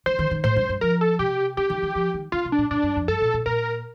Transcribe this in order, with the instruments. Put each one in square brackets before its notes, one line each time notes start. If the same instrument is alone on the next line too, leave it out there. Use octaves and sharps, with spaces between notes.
[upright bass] D#3 [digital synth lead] C5
[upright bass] D#3
D#3
[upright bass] A2 [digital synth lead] C5
[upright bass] G2
G2
[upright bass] F3 [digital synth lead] A#4
[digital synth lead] A4
[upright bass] C3 [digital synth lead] G4
[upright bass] D3 [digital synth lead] G4
[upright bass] D#3
D#3
F3
D#3
[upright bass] D3 [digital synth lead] F4
[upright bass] C3
[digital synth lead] D4
[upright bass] A2
[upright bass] A2 [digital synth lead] D4
[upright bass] G2
F2
[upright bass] G2 [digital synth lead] A4
[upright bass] A#2
A#2
[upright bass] A#2 [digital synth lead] A#4